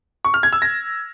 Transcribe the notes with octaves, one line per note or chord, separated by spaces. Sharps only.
C#6
F6
G#6
E6
A#6